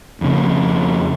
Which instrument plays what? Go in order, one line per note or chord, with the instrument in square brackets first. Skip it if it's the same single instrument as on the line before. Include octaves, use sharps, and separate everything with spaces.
[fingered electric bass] F2 C#3